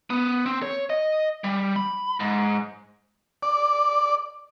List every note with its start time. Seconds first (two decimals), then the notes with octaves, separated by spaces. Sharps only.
0.10 B3
0.46 C4
0.62 C#5
0.90 D#5
1.44 G3
1.76 B5
2.20 G#2
3.43 D5